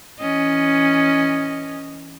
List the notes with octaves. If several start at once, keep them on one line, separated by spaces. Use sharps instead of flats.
E3 C#4 D#5